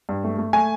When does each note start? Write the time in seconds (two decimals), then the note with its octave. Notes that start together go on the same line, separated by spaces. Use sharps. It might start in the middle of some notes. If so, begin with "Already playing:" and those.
0.09 G2
0.24 A3
0.38 A3
0.53 A3 G#5